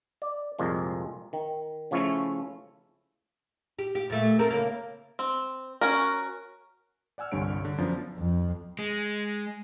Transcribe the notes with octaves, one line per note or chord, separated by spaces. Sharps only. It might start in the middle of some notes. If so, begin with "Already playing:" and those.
D5
C2 F2 A#2 F3 G#3
D#3
C#3 F3 A3 C#4 E4
G4
G4
A#2 A3
C4 A4 A#4
C#3 A#3
C4
C#4 F#4 A#4
D5 F#5 G#5 E6 F6
G1 C2 G2 D3 C#5 D7
D3
F#2 F3 B3 D4
F2
G#3